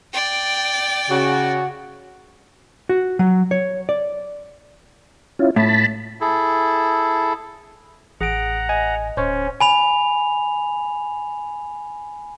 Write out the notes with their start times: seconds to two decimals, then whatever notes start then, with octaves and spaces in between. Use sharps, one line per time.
0.12 D5 G5
1.10 C#3 F#4
2.89 F#4
3.19 F#3
3.51 C#5
3.89 D5
5.39 C#4 E4 F4
5.56 A2 A5 B5
6.21 E4 G#4 A4
8.21 A1 G#4 F#5 A#5 D7
8.69 D#5 G#5
9.17 D1 C#4 C5 C#5
9.61 G#5 B5 F7